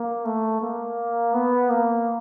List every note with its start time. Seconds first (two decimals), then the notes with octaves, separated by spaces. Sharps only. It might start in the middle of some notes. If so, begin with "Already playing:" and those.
Already playing: A#3
0.25 A3
0.61 A#3
1.34 B3
1.70 A#3